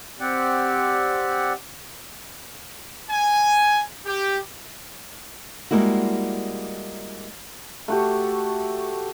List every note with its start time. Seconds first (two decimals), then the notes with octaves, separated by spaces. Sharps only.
0.19 C4 G4 D5 F#5
3.10 G#5
4.06 G4
5.71 G3 G#3 A#3 E4 F#4
7.88 A3 F#4 G4